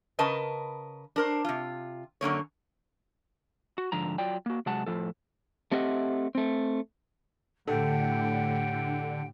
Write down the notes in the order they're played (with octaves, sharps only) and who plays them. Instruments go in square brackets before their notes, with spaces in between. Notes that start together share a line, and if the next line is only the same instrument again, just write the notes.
[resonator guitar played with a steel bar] C#3 A#4 B4 D#5 A5
D4 A#4 C5
C3 F4
F#2 D3 A#3 C#5
[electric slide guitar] F#4
G#2 D3 F3 A#5
F#3 F4 D5 G5
A#3 F#4
C3 F#3 G#3 F#5 A5
F2 A2 E3 F3 A4
A3 C4 G4 D#5 E5 F#5
A3 C4
[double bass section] A2 [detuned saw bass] D3 [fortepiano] A3 [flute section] G4 F#5 G5